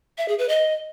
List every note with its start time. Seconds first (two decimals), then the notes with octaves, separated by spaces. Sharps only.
0.18 E5
0.28 G#4
0.39 B4
0.49 D#5